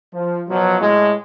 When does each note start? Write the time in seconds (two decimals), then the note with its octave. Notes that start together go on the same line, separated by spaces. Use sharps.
0.13 F3
0.49 B2 F3 F#3
0.81 A2 G#3